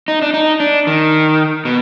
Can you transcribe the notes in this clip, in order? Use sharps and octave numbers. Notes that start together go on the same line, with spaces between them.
D#4
D4
D#4
D4
D#3
B2